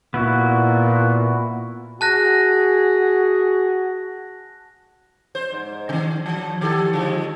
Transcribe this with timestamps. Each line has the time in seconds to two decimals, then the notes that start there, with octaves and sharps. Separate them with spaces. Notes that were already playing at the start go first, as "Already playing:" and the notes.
0.14 A#2 B3 E4 F#4
2.01 F#4 G#4 A5 F#6 A#6
5.35 C5
5.52 G#2
5.89 C3 D#3
6.26 F3
6.61 D#3 G4 A4
6.93 D3 F3 G#3